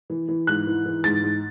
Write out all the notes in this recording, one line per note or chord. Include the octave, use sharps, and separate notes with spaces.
E3
E3
G#2 F#6
E3
E3
G#2 A6
G#2